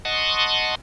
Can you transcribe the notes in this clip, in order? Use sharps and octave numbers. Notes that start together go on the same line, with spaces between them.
D#5 F#5 A5 C6 C#6 D#6